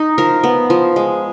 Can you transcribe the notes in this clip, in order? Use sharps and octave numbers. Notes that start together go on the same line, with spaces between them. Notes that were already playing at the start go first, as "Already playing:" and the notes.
Already playing: D#4
F3 A#4
B3
F3
G#3